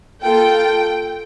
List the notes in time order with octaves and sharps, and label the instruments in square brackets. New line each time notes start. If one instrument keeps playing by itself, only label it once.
[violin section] A#3 F4 A4 G5